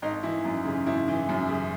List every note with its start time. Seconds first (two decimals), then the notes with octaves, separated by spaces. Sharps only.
0.02 G#1 D#4
0.23 E3 E4
0.45 F#2
0.65 C#3
0.86 G#1 E4
1.08 E3
1.29 F#2
1.49 C#3